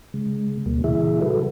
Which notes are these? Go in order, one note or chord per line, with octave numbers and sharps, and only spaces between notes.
C#3 G#3
D2 B2 G3 A#3
A#2 C#3 E3 E4 G#4 E5
C#3 G3 F#4 A4 B4